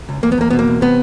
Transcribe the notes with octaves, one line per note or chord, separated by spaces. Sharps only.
C#2
E2 A#3
B3
E2 A#3
B2 B3
A#3
E2
C3 B3